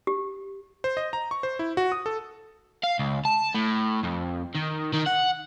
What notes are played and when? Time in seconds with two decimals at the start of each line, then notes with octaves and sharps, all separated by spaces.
0.07 G4
0.84 C5
0.97 D#5
1.13 A#5
1.31 C#6
1.43 C5
1.59 E4
1.77 F#4
1.92 D#6
2.06 A4
2.83 F5
2.99 C#2
3.25 A5
3.54 A2
4.03 F2
4.55 D#3
4.94 D#3
5.07 F#5